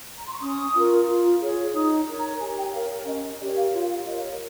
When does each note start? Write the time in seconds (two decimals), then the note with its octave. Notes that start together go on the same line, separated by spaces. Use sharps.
0.18 A#5
0.26 C6
0.33 C#6
0.41 C#4 D#6
0.75 F4 A#4
1.08 F4
1.40 G#4 C#5
1.73 D#4 D#6
2.07 A#4 C#5
2.17 A#5
2.40 G4 G#5
2.57 G5
2.73 A#4 C#5 F5
2.90 C#5
3.06 C#4 D#5
3.40 G4 A#4 C#5 D#5
3.57 F5
3.73 F4 F5
3.90 F5
4.06 A#4 C#5 D#5
4.23 C#5